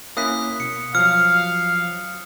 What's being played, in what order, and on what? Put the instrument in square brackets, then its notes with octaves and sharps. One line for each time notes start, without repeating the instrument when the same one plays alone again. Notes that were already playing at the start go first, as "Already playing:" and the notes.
[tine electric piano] A#3 C#4 E4 [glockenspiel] D#6 F#6 B6
[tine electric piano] B2 [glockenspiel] C#7
[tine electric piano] F3 F#3 [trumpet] F5 [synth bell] F6